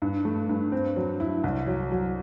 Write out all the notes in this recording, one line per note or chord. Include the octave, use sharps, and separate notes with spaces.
G2
A3
G2
C4
F#3
E4
C2
F#3
F#3